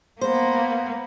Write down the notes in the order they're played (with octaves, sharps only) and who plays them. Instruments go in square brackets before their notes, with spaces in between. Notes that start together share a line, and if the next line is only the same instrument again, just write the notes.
[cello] A#3 B3 [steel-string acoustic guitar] C5